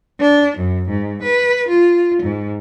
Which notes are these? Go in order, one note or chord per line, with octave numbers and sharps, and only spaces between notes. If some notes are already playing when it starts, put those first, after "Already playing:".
D4
F#2
G#2
B4
F4
G#2